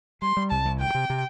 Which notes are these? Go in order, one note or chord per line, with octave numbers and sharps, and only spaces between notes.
G3 C6
G3
C2 A5
C2
D2 G5
C3
C3